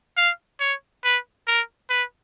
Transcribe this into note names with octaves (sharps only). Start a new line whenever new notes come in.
F5
C#5
B4
A#4
B4